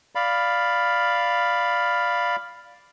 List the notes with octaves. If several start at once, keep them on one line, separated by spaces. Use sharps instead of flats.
D5 F5 B5